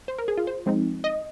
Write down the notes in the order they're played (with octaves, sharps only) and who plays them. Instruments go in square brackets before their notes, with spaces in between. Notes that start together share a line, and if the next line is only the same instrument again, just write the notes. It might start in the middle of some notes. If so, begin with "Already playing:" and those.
[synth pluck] C5
A#4
G#4
F4
C5
F3 G#3 C4 D#4
D#5